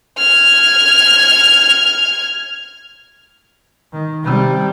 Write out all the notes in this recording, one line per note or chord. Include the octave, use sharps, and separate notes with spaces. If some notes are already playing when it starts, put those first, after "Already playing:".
F6 G#6
D#3
C3 G3